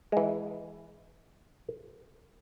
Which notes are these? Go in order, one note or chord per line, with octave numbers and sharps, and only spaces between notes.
E3 G#3